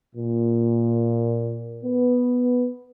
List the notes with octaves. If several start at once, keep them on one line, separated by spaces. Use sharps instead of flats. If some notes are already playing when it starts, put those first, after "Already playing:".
A#2
B3